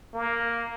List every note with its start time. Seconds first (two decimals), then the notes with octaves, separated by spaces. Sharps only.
0.14 A#3